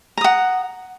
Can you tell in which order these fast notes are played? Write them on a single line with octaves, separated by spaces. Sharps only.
A#5 D#6 F#5